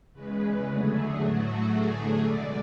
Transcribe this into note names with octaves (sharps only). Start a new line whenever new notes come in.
E2 C#3 G#3 B4
E2 D3 F#3 A3 G#4
A2 F#3 A3 F#4
E2 D3 F#3 A3 G#4
B2 D5
G#3